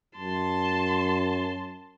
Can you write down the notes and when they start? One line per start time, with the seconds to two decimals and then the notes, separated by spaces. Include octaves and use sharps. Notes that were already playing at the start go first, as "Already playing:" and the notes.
0.17 F#2 A5 C6